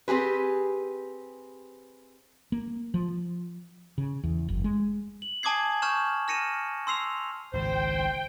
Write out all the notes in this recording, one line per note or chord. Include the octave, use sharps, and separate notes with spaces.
C4 G4 G#4 B4
A#3
F3
C#3
E2
F#1
G#3
F#7
G#5 A5 D6 D#6 G#6 C7
A5 C#6 F6 G6 E7
F6 A#6 C#7 D#7 E7
C6 E6 C7 F7
G#1 C#2 G#2 C5 G5